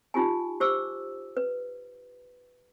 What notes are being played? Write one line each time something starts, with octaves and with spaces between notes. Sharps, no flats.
D#4 F4 G4 G#5
G4 C5 D6 E6
B4